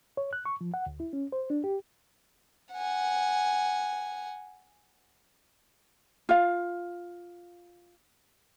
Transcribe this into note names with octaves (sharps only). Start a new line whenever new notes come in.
C#5
F#6
C#6
F3
F#5
D2
E4
C#4
C5
D4
G4
F#5 G#5
F4 F5